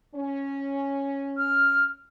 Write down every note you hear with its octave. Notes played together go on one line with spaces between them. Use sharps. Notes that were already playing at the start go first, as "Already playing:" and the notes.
C#4
F6